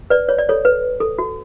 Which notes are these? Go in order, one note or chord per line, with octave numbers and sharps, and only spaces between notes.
B4 D5
C#5
D5
A4 C#5
B4
A4
F#4